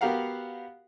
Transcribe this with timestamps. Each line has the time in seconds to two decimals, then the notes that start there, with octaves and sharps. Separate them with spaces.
0.01 B3 F#4 G4 A#4 F5 F#5